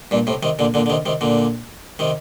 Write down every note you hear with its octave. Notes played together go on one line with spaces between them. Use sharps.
G2 A#2
A2 C3
C3 D#3
A#2 D3
A#2 D3
D3
C3 D#3
C3 D#3
A#2 D3
C3 D#3